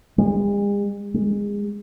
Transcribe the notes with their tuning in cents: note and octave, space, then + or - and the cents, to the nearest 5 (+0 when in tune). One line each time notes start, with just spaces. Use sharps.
G#3 -45
G#3 -25